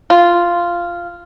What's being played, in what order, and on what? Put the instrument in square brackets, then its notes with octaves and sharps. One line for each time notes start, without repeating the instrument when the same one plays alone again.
[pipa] F4